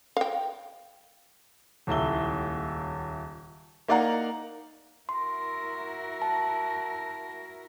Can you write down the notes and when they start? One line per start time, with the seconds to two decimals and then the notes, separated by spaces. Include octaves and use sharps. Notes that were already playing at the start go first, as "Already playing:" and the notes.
0.17 F5 G5
1.87 D#1 C#2 E4 G7
3.88 A#3 D#4 D5 F5 F#5 A#5
5.09 E4 F#4 A#4 C6
6.22 A5